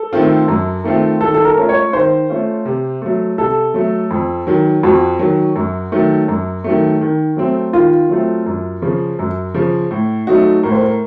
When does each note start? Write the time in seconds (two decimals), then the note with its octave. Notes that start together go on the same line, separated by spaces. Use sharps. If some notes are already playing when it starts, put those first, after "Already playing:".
Already playing: A4
0.13 D#3 A3 C4 F4
0.48 F#2
0.84 D#3 A3 C4 F4
1.20 D#3 A4
1.34 A4
1.45 A#4
1.56 A3 C#4 F4
1.69 C#5
1.93 D#3 C5
2.30 A3 C#4 F4
2.65 C3
3.02 F#3 A3
3.38 C3 A4
3.74 F#3 A3
4.11 F2
4.47 D#3 F#3
4.83 F2 F#4
5.19 D#3 F#3
5.55 F#2
5.92 D#3 F#3 A3
6.28 F#2
6.64 D#3 F#3 A3
7.01 D#3
7.37 F#3 A3 C4
7.73 D#3 F4
8.09 F#3 A3 C4
8.46 F#2
8.82 C#3 F3
9.19 F#2
9.54 C#3 F3
9.91 A2
10.27 F#3 A3 D#4 F#4
10.63 A2 A#4
10.72 C5
10.80 A#4